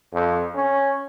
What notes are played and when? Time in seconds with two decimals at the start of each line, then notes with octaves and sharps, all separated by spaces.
0.14 F2
0.55 C#4